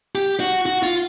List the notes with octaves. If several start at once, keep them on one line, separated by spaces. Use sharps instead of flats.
G4
F#4
F#4
F4